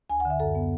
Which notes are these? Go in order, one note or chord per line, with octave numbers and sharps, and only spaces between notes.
D2 G#5
F#5
D3
E5
F#2 A4
B3